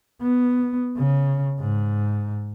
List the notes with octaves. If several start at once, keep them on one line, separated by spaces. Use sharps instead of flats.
B3
C#3
G#2